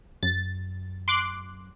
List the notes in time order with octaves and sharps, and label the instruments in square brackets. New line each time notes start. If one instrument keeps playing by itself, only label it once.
[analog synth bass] F#2 [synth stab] A6
[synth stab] C6 D6 F#6